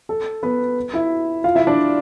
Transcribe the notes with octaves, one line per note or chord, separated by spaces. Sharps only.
A4
B3 B4
E4 E5
F4 F5
E4 E5
D4 D5